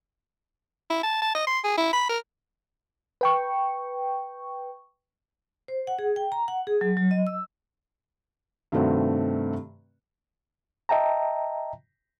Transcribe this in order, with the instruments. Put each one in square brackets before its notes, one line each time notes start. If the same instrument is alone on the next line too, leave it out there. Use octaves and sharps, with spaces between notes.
[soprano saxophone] E4
A5
A5
D#5
C6
G#4
E4
B5
A#4
[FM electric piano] B4 G5 C#6
[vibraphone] C5
F#5
G#4
G5
A#5
F#5
G#4
F#3
F#3
D#5
E6
[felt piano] G2 C3 D#3 A3 C4 F#4
[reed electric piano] D#5 E5 G5 A5 A#5